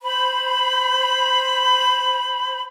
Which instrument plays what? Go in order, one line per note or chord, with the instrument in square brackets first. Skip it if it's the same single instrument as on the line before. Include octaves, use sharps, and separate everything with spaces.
[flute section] C5 B5